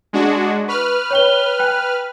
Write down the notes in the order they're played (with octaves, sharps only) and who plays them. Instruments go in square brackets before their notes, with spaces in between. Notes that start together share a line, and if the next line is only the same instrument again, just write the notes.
[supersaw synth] G#3 D4 F#4
[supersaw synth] B4 F6 [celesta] C#6
[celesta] C#5 G5 G7
G5 G#5 F#6